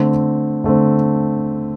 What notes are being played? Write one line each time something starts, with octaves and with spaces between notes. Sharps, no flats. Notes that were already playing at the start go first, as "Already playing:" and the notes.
Already playing: D3 A3 C4
D3 A3 C4